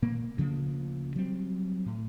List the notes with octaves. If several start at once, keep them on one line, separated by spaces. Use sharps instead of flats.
A#2 A#3
D2 C#3 F3 A#3
F#3 G3 C4
A2